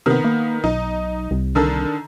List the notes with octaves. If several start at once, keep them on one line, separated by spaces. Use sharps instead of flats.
C3 D#3 B3
A#3
B1 D#4
C2
D3 D#3 A4